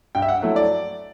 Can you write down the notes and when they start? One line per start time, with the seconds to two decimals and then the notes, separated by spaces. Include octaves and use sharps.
0.15 G2 G5
0.22 E5
0.28 F#5
0.42 F#3 A3 E4 F#5
0.56 D5